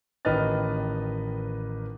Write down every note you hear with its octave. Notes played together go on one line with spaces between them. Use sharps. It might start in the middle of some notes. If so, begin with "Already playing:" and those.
A1 D#3 B4 D#5 F6 A6